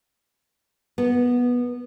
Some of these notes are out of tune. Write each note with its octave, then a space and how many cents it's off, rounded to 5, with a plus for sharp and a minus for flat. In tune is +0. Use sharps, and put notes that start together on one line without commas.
B3 -15 A#4 -30